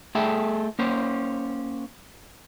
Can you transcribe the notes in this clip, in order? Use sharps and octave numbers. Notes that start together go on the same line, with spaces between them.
A3 G#4 A4 E5 G5
A#3 C#4 C5